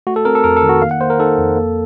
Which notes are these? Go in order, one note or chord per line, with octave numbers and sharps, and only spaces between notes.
A3 F#4
A4
C4 A#4
A4
F2 A#4
A4
D#3
F#4
A#3 F5
F#5
A#3 C5
A#4
D#4 A4
F2
A#3